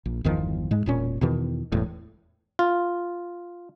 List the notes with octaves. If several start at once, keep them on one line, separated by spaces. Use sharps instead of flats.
A#1
G1 E2 D#3 F3
G#2 G#3
E1 A#2 C#4
E2 B2 D#3
E1 E2 A2
F4